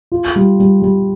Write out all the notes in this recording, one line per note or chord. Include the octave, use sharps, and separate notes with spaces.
F4
G3
G3
G3